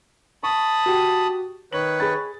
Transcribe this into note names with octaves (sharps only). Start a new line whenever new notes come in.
A5 B5 C#6 D#6
F#4 G4
D#3 B4 C#5 F#7
G#4 B5 A6